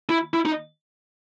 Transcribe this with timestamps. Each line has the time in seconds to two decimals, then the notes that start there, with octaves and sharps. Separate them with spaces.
0.09 E4
0.33 E4
0.45 D#4